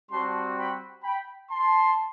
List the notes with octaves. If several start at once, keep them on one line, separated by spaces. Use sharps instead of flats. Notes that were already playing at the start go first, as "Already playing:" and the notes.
G3 C4 F#4 A5 C6
G5 B5
G5 B5
A5 C6